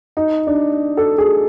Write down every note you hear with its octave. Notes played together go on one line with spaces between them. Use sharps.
D#4
D4
A4
G#4